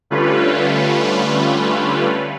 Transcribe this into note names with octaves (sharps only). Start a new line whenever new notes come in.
D3 G3 A3 C#4 F4 B4